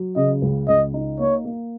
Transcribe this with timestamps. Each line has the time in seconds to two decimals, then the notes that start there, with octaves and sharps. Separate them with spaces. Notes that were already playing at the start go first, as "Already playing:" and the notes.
Already playing: F#3
0.16 C#3 D#5
0.42 C#2
0.68 C#2 D#5
0.94 D#4
1.19 A#3 C#5
1.45 A#3